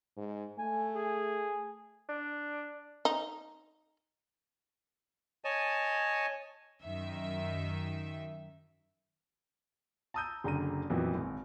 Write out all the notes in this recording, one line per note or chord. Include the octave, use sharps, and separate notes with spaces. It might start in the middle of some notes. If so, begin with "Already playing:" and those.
G#2
A3 G#5
G#4
D4
D#4
C#5 D#5 G#5 A5
F#2 D#3 E5
A5 A#5 D#6 E6 G6 D#7
F#1 D3 A#5 D#7
F2 A#2 E3 F#3 A#3 B3
G#1